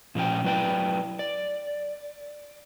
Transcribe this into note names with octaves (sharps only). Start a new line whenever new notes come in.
A#2 F3 C#4 G5
F#3 E4 B4 D5 G5
D5